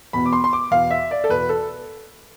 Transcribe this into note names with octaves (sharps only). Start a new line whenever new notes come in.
E2 B2 B5
D6
C6
C6
D6
E2 B2 F5
E5
D5
A4
E2 B2 B4
A4